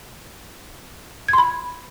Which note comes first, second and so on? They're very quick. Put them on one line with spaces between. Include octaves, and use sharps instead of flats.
G#6 C6 B5